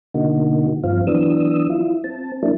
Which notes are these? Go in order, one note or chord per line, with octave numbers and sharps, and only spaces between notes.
B2 D3 A#3 D#4 F#4
G2 F3 C4 F5
E3 F#3 B3 D4 D#6 E6
E4 F4
C4 A5
F#3 A#3 D4 E4